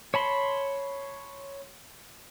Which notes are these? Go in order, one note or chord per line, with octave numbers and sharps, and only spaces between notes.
C#5 A5 B5 C6